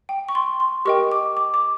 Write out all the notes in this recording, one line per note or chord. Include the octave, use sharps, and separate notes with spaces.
G5
C#6
C6
C6
G4 A#4 D#5 G5 C#6
D6
D6
D6